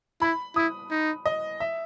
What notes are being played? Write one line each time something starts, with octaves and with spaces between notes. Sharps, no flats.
E4 B5
E4 D#6
D#4
D#5
E5